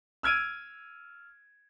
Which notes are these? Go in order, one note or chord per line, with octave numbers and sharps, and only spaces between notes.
E6 F6 G#6 D7 D#7